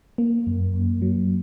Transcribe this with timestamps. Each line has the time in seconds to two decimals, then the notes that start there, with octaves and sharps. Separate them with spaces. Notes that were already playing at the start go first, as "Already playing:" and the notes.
0.18 A#3
0.47 F#2
0.74 F#2
1.02 F#3